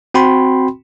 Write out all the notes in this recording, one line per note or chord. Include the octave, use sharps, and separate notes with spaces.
C4 F#4 G5 B5 C6